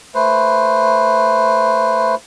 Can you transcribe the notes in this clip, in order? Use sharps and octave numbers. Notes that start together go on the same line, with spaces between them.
A3 B4 C5